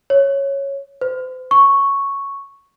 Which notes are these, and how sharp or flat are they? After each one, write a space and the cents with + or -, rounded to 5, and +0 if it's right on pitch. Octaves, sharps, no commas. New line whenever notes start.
C#5 -5
C5 -40
C#6 +0